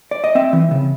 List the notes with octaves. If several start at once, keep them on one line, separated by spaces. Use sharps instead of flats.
D5
D#5
C4 E5
E3
C#3